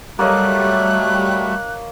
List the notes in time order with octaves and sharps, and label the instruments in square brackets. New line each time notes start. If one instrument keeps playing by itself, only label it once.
[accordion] F#3 A3 [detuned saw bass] G3 [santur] A#3 C#5 D#5 [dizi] F#6